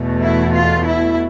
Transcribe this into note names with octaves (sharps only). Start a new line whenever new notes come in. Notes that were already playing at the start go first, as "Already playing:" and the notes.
Already playing: E2 B2 A3
E4
F4
E4